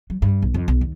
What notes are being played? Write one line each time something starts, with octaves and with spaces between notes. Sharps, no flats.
F#3
G2
B1
F2
B1
D#2